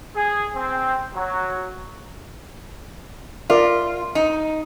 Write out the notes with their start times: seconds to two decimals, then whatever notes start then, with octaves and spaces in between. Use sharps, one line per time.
0.14 G#4
0.54 C4
1.13 F#3
3.50 F4 A#4 D5 E5
4.15 D#4